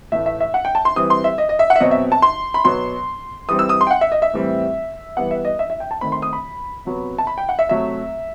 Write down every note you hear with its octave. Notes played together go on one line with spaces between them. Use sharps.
A2 E3 A3 E5
E5
E5
F#5
G5
A5
C6
E3 G3 C4 D#6
C6
E5
D#5
D#5
E5
F#5
E5
B2 F#3 C4 D#5
E5
A5
C6
B5
B2 F#3 B3 C6
E3 G3 C4 D#6
E6
D#6
C6
G5
F#5
E5
D#5
E5
A2 E3 G3 C4
E3 G3 B3 F#5
E5
D#5
E5
E5
G5
A5
D#3 A3 C4 B5
C6
D#6
B5
C3 F#3 B3
A5
B5
G5
F#5
E5
C3 F#3 A3 E5